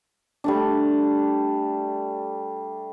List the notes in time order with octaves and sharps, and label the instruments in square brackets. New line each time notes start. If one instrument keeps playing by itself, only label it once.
[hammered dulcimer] G3 A3 D4